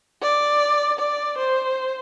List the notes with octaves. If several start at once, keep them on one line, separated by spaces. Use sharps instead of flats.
D5
D5
C5